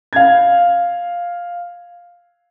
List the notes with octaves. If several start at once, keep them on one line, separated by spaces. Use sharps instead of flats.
F5 G#6